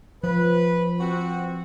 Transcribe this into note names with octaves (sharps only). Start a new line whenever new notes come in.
F3 B4
C4 F#4